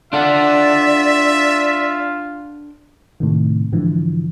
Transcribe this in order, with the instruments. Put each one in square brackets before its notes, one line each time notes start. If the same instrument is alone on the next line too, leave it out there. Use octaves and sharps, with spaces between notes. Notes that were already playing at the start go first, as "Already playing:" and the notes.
[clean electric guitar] D4 A4 F#5 [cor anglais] F4 [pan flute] D5 [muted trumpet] E5
[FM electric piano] A2 C3 D#3
G#2 D3 E3 F3